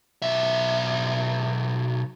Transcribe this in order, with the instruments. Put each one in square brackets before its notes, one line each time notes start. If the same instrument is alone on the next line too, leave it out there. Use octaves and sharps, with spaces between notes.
[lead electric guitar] B1 E5